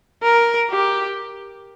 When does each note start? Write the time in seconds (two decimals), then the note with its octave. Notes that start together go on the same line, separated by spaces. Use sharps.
0.23 A#4
0.71 G4